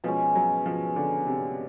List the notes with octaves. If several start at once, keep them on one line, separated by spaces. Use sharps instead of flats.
B2 F3 G#3 C#4
F#3
F3
D3
C3